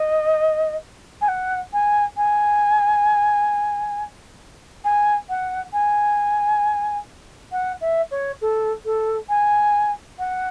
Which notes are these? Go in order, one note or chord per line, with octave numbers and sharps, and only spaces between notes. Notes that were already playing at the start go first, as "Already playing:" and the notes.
Already playing: D#5
G#5
F#5
G#5
G#5
G#5
F#5
G#5
F#5
E5
C#5
A4
A4
G#5
F#5